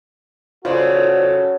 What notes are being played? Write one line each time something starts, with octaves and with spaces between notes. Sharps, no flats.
C#3 F4 F#4 A4 C5 D5